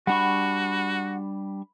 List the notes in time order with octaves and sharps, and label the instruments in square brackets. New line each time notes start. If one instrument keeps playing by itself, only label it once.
[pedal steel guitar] G3 D4 C#6 [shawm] F#4 [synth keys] F#5 [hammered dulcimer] B5